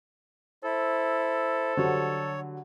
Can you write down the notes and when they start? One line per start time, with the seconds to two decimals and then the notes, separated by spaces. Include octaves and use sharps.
0.64 E4 A4 C5
1.77 D3 F#3 G3 C#5